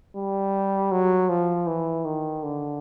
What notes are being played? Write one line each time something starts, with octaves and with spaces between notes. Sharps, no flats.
G3
F#3
F3
E3
D#3
D3